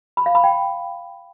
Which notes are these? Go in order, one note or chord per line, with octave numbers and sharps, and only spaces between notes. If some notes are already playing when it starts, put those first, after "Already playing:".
B5
F5
B5
G5